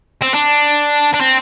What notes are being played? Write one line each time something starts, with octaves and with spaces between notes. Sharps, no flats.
C4
D4
D4
C4